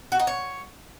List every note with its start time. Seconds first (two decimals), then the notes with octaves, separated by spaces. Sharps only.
0.12 F#4
0.20 D#4
0.27 C#5